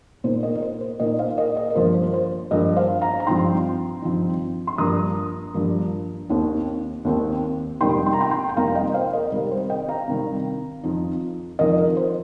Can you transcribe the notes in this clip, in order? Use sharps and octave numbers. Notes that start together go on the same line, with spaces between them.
A#2 A#3 D#4 C5
A#4 D#5
A#4
C5
C5
A#2 A#3 D#4 A#4 D#5
C5 F5
A#4 D#5
A#4 D#5
A#4
G2 F3 A#3 C5
C5
C5
G2 F3 A#3 A#4 D#5
C5 F5
F5 A#5
A#5
G2 F3 C4 D#4 G5 C6
G2 F3 C4 D#4
C6
G2 F3 A#3 A#5 D#6
G2 F3 A#3
D#2 D#3 C4 D#4
D#2 D#3 C4 D#4
F2 C3 G3 A#3 D#4 G5 C6
C6
A#5
G5 C6
G5 C6
G5
F2 C3 G3 A#3 D#4 F5 A#5
D#5 G5
C5 F5
A#4 D#5
C3 D#3 G3 A#4
A#4
C5
D#5 G5
F5 A#5
C3 D#3 G3
F2 F3 D#4
F2 F3 D#4 A#4 D#5
A#4
C5